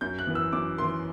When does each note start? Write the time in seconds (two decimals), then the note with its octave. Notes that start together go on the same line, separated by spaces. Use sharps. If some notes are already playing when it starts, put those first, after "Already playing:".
0.01 F#2 G6
0.19 F#6
0.27 E3 B3
0.35 E6
0.53 F#2 D6
0.78 E3 B3 C6